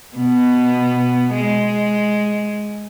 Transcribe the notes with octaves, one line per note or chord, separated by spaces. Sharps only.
B2 B3
G#3